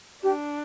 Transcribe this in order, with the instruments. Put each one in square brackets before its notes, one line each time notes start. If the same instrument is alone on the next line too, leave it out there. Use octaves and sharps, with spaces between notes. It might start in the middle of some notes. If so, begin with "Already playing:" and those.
[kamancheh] D4 [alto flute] G4